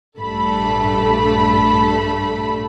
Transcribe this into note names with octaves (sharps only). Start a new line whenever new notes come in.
A#1 G2 A3 A4 B5